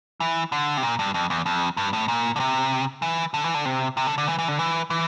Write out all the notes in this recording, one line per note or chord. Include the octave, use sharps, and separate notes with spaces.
E3
D3
C3
A#2
G2
F2
E2
F2
G2
A2
A#2
D3
C3
E3
D3
E3
D3
C3
C3
D3
D3
E3
E3
D3
E3
E3